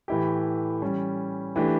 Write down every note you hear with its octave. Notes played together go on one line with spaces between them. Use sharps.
A2 E3 A3 E4 G4
E3 G3 C#4
E3 A3 D4 G4